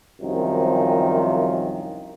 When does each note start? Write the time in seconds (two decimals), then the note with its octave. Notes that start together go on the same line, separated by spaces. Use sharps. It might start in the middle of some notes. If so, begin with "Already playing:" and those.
0.22 C2 F#2 C3 D#3 F3